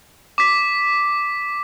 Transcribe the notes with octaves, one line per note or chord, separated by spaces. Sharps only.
D6 B6